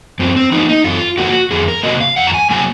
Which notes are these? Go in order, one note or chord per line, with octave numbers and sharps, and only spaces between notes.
F#2 C4
C4
F3 A#3 D#4
D#4
F#2 F4
F3 A#3 F#4
F2 G#4
A#4
C3 F#3 A#3 D#5
F5
F2 F#5
A#5
G#5
C3 F#3 A#3 G#5